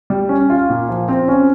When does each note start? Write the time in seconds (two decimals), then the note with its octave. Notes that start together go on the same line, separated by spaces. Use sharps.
0.10 G3
0.29 C#4
0.50 F4
0.70 A#2
0.89 F3
1.08 C4
1.28 C#4